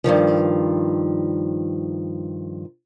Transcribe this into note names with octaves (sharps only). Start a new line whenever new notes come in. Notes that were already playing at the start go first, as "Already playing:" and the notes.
G2 A#2 D#3 F3